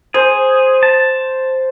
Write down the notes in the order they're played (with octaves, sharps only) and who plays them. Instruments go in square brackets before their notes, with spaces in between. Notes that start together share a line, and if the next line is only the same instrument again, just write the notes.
[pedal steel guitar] G#4 [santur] C5
[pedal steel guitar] A5